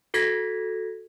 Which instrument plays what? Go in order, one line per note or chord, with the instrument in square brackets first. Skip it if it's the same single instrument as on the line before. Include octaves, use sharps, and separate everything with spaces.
[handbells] F#4 A4 G#6 A#6 B6